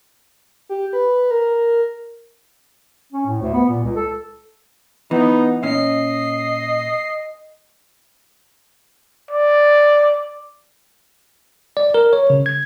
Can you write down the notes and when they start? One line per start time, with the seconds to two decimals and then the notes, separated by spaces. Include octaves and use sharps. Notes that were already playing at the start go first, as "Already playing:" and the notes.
0.69 G4
0.93 B4
1.31 A#4
3.12 C#4
3.26 A2
3.42 D2
3.53 B3
3.69 A#2
3.83 C#2
3.96 A4
5.11 E3 B3 D#4
5.63 A#2 C#4 D#5 C7
9.31 D5
11.77 D5
11.94 A#4
12.13 C#5
12.30 C#3
12.46 G#6